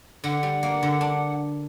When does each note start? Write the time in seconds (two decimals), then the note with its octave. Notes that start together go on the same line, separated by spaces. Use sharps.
0.24 D3 F#5
0.43 G3
0.63 A#3
0.83 D3
1.01 D4